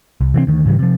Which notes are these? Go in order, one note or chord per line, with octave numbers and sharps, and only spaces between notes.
C2
C3 E3 G#3 C4
D2 D#3
G#2 C#3 E3 G3
C3 F3